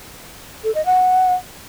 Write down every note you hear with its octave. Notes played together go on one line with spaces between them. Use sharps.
A4
D#5
F#5